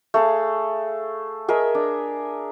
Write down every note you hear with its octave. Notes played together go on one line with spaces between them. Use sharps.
A3 G#4 F5
G#4 A#4 D#5 E5
D4